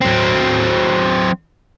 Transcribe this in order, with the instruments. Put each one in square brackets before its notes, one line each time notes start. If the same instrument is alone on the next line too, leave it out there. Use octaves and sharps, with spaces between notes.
[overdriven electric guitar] F#3 C4